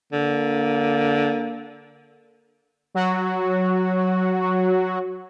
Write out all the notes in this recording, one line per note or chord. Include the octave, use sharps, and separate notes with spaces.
D3 A#3
F#3 F#4